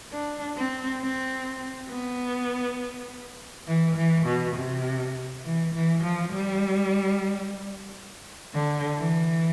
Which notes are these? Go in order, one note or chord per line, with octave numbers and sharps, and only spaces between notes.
D4
C4
C4
B3
E3
E3
B2
C3
E3
E3
F3
G3
D3
E3